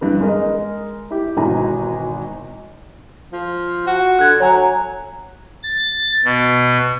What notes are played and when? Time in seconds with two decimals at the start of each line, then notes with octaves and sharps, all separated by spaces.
0.01 G2 E3 B4
0.21 G#3 A#4 D#5
1.11 E4 G4
1.37 G#1 B2 E3 G#5 A#5 B5
3.33 F3
3.86 F#4
4.19 D3 F#6 G#6
4.40 F#3 C#5 G#5 A#5
5.63 A6
6.25 B2